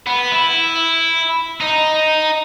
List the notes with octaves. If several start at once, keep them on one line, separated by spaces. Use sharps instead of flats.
B3
E4
D#4